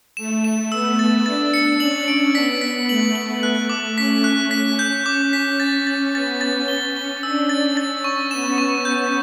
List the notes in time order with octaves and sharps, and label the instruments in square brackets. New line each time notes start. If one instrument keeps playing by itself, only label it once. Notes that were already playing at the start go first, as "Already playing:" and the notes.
[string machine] A3 [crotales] E7
[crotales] E7
[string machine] B3 [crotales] E6
[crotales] A6
[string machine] D4 [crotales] A6
[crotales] C#7
[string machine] C#4 [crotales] F#7
[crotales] D7
[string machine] B3 [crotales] B6
[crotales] B6
[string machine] A3 [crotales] F#7
[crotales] F#7
F#6
D6
[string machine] C#4 [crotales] B6
[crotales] F#6
[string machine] C#4 [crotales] B6
[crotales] G6
[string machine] C#4 [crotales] D6
[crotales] B6
A6
A6
[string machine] B3 [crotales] A6
[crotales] A6
[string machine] C#4 [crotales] G7
[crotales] G7
[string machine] D4 [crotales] E6
[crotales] A6
[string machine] C#4 [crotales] A6
[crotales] C#6
[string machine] B3 [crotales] E7
[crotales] C#6
G6